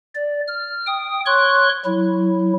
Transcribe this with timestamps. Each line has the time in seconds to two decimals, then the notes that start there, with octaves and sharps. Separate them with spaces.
0.15 D5
0.48 F6
0.87 G5 D#6
1.26 C#5 C6 C#6 F#6
1.85 F#3 E4